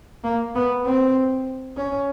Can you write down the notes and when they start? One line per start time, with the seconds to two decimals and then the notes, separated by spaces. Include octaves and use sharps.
0.24 A#3
0.55 B3
0.85 C4
1.77 C#4